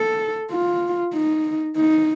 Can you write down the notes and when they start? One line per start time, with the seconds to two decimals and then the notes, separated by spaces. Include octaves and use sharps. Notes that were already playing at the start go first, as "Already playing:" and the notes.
Already playing: A4
0.51 F4
1.14 D#4
1.77 D#4